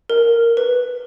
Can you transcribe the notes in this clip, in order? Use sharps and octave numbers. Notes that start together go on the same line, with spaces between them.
A#4
B4